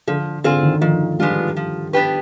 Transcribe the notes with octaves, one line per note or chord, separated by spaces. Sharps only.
D3 F3
D3 C4 F4 G#4
D#3
D#3 F3
G3 G#3 B3 D4 F4
F3
B3 D4 G4 B4